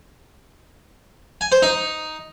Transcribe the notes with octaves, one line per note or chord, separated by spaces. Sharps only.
G#5
C5
D#4